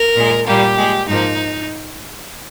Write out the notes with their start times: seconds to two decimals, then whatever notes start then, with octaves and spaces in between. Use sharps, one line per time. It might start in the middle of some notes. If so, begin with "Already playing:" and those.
Already playing: A#4
0.16 A#2 G#3
0.47 A#2 G3 A#3 G4
0.78 A#2 G#3
1.09 G#2 F3 A#3 D#4